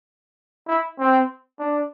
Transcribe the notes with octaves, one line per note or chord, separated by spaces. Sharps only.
E4
C4
D4